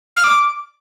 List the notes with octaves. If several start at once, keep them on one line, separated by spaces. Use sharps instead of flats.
F6
D6